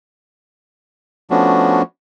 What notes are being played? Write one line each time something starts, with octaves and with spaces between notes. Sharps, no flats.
F3 A3 B3 C#4 D4 F#4